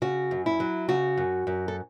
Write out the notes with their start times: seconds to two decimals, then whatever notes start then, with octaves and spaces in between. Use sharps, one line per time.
0.02 C#3 F#4
0.31 F#2
0.46 E4
0.60 F#3
0.89 C#3 F#4
1.17 F#2
1.47 F#2
1.68 A4